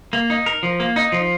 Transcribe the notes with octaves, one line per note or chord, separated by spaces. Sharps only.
A#3
D#4
A#4
F3
A#3
D#4
F3